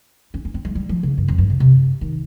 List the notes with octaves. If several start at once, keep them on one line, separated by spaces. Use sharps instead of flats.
C#4
C#4
C4
G#3
G3
F3
C#3
G2
F2
G2
C3
C3
D#3